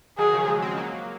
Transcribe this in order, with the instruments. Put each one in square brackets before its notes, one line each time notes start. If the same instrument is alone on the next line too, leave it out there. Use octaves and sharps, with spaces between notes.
[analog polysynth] D#3 F#3 [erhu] G#4
[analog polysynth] C#3 F3
F3 G#3
G#3 C4
F#3 A#3